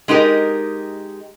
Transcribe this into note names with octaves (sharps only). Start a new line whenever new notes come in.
G#3 D#4 G4 A#4